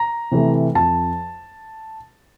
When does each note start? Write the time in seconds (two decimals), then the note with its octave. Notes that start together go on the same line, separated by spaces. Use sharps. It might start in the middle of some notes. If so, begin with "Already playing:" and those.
Already playing: A#5
0.32 C3 E3 A3
0.75 F2 A5